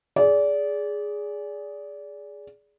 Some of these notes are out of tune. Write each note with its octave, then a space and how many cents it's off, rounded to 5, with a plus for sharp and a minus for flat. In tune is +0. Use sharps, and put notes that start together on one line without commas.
G#4 +0 D5 -25